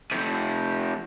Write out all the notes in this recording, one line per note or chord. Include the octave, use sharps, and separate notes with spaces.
C3 F3